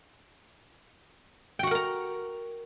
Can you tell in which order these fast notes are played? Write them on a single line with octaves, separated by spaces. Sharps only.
G5 F#4 F#5 A#4 A#5